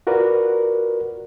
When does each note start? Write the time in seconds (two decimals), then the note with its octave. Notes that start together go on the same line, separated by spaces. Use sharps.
0.07 F4 F#4 A#4 B4 D5